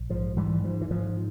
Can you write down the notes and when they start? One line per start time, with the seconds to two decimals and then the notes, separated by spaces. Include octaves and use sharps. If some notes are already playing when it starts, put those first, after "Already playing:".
Already playing: A#1
0.10 G#2 F3
0.36 G#2 E3 G3
0.64 G#2 F3
0.81 E3
0.90 G#2 F3